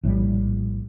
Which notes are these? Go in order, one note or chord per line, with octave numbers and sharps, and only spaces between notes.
A#1 A2 F3 G3